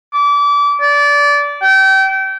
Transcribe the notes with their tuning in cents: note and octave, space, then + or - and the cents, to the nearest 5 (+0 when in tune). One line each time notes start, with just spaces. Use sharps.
D6 -30
D5 -25
G5 -30